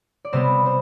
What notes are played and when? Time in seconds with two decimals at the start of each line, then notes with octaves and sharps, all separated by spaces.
0.25 D5
0.33 C3 G3 B3 C4 C5
0.66 C5